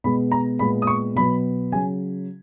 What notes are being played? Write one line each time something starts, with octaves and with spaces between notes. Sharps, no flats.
B2 G#3 B3 B5
A#5
A#2 G#3 B3 B5
D#6
C#6
B2 F#3 B3 B5
C#3 F#3 G#5